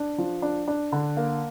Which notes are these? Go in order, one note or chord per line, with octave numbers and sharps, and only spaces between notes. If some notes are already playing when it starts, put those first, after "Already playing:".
Already playing: D4
F3
D4
D4
D3
A#3